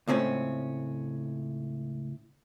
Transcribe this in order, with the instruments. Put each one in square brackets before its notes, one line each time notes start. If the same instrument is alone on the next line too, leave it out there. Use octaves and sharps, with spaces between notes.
[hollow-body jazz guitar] C#2 A2 C4 C#4